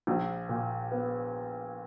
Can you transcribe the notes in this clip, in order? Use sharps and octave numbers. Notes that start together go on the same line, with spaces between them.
A#1
A#2
B3